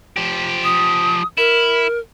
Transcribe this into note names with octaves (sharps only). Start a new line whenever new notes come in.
F3 G4
D#6
E4 A#4